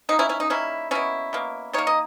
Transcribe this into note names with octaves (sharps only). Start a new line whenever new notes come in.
D#3 A#3 D#4
C#4 E4
C#4 E4
D#4
D#3 G3 A#3 C#4 E4
B2 A#3 C#4 E4
B2 A#3
D#3 A#3 C#5
D#5